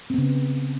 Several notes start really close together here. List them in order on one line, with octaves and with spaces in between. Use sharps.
C4 B3 C#3